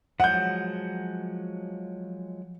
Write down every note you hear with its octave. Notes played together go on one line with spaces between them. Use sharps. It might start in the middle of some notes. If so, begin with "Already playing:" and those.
F3 F#3 G#3 F#5 G6